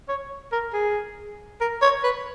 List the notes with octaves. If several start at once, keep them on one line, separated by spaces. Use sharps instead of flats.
C#5
A#4
G#4
A#4
C#5
B4